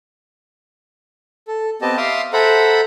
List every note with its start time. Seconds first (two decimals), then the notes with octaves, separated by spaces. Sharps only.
1.48 A4
1.82 B3 C4 G4 D#5 A5
1.97 E5 F5 C6 D6 D#6
2.33 A4 C5 E5 F#5 A#5 B5